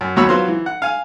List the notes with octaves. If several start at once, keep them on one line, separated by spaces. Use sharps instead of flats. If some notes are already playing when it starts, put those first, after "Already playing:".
F#2
D#2 B2 F#3 C#5 B5 E6
F#3 B3 F4 C5
E3
F#5
F5 G#5